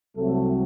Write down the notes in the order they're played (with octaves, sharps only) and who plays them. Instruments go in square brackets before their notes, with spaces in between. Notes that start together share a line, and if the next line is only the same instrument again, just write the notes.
[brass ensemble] C2 C3 F#3 A3